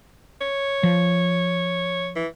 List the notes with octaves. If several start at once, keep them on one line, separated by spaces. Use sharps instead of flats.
C#5
F3
E3